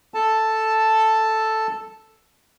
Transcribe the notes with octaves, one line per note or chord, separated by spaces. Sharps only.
A4 A5